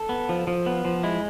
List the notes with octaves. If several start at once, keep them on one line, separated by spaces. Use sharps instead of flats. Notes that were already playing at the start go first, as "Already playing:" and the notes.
Already playing: A4
B3
F3
F3
B3
F3
G#3 E4